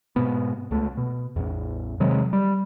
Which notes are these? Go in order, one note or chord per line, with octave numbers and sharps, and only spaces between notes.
G#2 B2 B3
C#2 A3
B2
A1 E2
C3 D#3 F#3 G#3
G3